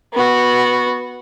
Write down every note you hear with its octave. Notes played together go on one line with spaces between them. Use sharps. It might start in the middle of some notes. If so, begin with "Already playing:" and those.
B3 F#4